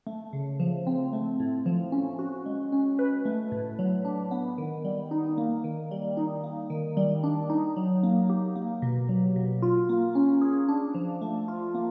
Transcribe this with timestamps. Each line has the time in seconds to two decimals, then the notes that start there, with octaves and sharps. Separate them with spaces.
0.07 A3
0.33 C#3
0.60 F3
0.87 C4
1.13 A3
1.40 A2
1.66 F3
1.92 C#4
2.19 F#4
2.46 G#3
2.72 C#4
2.99 B4
3.25 A3
3.52 A2
3.79 F#3
4.05 D4
4.31 B3
4.58 D#3
4.84 G3
5.11 D#4
5.38 A#3
5.64 D#3
5.91 G3
6.17 D#4
6.44 A#3
6.70 D#3
6.97 G3
7.23 D4
7.50 D#4
7.76 F#3
8.03 A#3
8.29 G4
8.56 A#3
8.82 B2
9.09 F#3
9.36 B2
9.62 F4
9.89 A#3
10.15 C#4
10.41 G#4
10.68 D4
10.95 F3
11.21 A3
11.48 F4
11.74 A#3